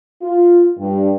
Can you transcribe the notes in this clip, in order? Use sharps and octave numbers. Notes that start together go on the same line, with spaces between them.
F4
G2